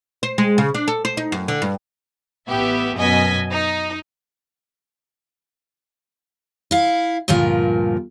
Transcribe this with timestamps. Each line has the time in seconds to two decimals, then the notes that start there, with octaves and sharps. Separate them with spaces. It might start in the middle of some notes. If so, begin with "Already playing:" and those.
0.23 C5
0.38 G#3
0.58 C#3
0.74 D4
0.88 A4
1.05 C5
1.17 D#4
1.32 F#2
1.48 D3
1.62 G2
2.48 A1 B3 G4 E5
2.96 F#2 B2 D#5 G#5 B6
3.51 D#4
6.71 E4 F5
7.28 D2 G2 A#2 F3 A#4